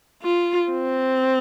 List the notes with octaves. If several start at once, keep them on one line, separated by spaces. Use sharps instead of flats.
F4
C4